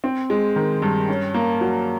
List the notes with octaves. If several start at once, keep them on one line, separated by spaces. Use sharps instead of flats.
C4
G#3
D#3
G2
C#4
A#3
F#3